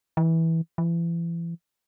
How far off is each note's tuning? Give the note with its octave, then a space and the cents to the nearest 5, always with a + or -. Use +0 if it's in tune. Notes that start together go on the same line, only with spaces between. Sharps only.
E3 -15
E3 +35